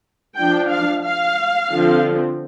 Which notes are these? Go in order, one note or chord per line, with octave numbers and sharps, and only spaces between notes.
F3 D4 G5
F5
F5
D3 F3 C4